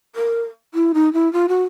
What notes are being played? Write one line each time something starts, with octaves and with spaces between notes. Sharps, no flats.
A#4
E4
D#4
E4
F4
F#4